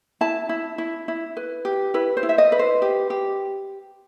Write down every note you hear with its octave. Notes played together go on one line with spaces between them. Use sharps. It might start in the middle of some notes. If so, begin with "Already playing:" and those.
E4 A5
E4
E4
E4
B4
G4
E4 B4
C5
E4
E5
D#5
B4
C5
G4
G4